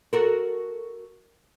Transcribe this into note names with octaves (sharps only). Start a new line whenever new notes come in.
F#4 A4 A#4